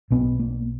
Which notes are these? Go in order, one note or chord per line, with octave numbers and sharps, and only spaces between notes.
B1 B2 B3
A#3